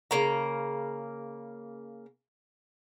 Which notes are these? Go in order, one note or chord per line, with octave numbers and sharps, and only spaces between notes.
C#3 A#3 A#5